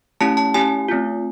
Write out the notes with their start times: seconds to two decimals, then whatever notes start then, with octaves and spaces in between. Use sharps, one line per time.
0.21 A3 C#4 E4 G4 A5
0.37 A5
0.54 A3 C#4 E4 G4 G#5
0.88 A3 C4 F4